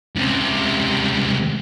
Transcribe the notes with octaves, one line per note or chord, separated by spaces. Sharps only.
C#2 C3